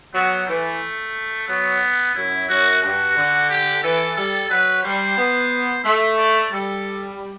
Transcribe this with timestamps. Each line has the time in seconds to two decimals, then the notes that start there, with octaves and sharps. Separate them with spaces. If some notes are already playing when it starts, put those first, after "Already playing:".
0.13 F#3 B3
0.47 E3 A3
1.48 F#3 B3
2.15 F#2 E4
2.49 F#2 F#4
2.82 G2 F#4
3.16 D3
3.50 G4
3.83 E3 A4
4.16 G3 A4
4.49 F#3 B4
4.83 G3 C5
5.17 B3
5.84 A3 E5
6.18 D5
6.51 G3 A4